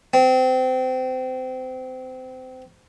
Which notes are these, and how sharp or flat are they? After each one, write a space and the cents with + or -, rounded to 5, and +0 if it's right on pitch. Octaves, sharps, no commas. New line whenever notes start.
C4 -25